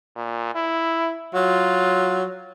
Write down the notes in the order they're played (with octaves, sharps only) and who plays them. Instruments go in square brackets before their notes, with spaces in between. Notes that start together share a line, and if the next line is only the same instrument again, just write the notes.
[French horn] A#2
E4
[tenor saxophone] F#3 [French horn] F4